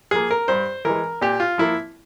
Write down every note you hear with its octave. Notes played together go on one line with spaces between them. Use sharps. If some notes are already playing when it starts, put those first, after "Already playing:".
F3 A#3 G#4
A#4
G2 C5
E3 G#3 A#4
A#2 G4
F4
F3 A#3 E4